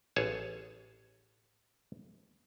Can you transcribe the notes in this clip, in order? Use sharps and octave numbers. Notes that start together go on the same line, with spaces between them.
A1 G#4 C#5 A5